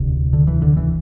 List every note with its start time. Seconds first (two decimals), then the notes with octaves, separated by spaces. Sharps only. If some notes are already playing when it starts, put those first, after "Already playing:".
Already playing: E1 D2 C3
0.33 D3
0.47 E3
0.62 D3
0.77 E3